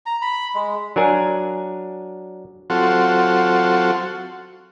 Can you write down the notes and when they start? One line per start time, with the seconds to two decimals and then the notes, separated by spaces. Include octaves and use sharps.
0.06 A#5
0.22 B5
0.55 G#3
0.96 F#3 D4 A#4 G#5
2.70 F#3 C4 F4 F#4 A4